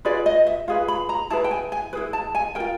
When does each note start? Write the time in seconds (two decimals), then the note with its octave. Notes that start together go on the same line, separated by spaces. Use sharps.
0.05 F4 G#4 B4 D5
0.26 D#5
0.47 E5
0.68 F4 G#4 B4 F5
0.88 B5
1.09 A#5
1.30 E4 G#4 B4 A5
1.44 G5
1.51 G#5
1.72 G#5
1.93 E4 G#4 B4
2.13 A5
2.35 G#5
2.55 F4 A#4 G5